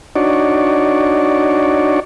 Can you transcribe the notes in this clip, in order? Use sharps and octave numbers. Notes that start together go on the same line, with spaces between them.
D4 D#4 F#4 C#5 D5